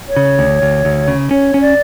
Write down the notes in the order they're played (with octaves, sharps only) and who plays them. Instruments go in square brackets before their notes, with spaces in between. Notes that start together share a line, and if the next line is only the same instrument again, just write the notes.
[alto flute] C#5
[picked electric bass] C#3
D2
D2
D2
C#3
[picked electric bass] C#4 [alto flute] C#5
[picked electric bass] C#4
[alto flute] D5